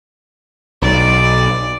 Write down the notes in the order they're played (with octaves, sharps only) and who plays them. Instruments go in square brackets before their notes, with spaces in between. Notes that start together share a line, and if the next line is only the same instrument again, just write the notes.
[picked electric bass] B1 [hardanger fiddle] D5